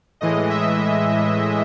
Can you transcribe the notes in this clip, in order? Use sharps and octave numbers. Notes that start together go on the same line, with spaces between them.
A2 E3 G#3 D#5
E5